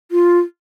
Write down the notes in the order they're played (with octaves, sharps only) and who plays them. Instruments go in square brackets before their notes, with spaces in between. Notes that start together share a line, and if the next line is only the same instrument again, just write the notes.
[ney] F4